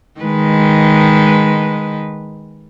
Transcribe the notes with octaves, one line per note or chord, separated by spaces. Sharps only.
D#3 G#3 B4